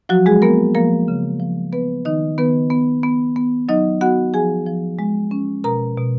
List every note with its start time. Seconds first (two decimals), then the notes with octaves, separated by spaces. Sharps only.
0.09 F3 F#3 F#4
0.26 G#3 G#4
0.42 A#3 B3 A#4
0.75 F3 A#3 A#4
1.08 C#3
1.40 F3
1.73 B3 B4
2.05 D#3 D#4 D#5
2.38 D#3 B3 B4
2.70 B3
3.03 B3
3.36 B3
3.69 F#3 D#4 D#5
4.01 B3 F#4 F#5
4.34 F3 G#4 G#5
4.67 F3
4.99 G#3
5.31 C#4
5.64 B2 A#4 A#5
5.97 B2